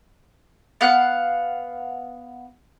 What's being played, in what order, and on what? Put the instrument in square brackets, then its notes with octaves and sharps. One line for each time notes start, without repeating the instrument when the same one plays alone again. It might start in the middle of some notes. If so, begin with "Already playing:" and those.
[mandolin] B3 F5 F#5 F#6